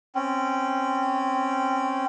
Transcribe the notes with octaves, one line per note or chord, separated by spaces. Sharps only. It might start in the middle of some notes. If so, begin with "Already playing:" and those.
C4 C#4